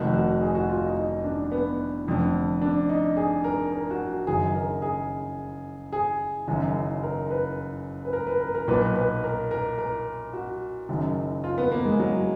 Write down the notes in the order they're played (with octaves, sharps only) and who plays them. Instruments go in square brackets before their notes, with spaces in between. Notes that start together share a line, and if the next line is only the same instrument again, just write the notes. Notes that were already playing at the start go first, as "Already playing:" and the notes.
Already playing: [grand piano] F1 F2 D#3 F#4
F#4
G#4
F#4
F4
D#4
D#4
D4
B3
F1 F2 D3
D4
D#4
G#4
A#4
A#4
F#4
F#4
F#1 F#2 D#3 G#4
A#4
G#4
G#4
F#1 F#2 D#3
A#4
B4
B4
A#4
B4
A#4
A#4
B1 A#2 B4
B4
A#4
A#4
A#4
F#4
F#1 F#2 D#3
F4
B3
A#3
G#3
F#3